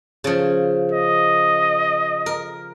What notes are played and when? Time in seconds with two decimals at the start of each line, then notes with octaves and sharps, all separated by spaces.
0.24 C#3 F3
0.92 D#5
2.26 A#4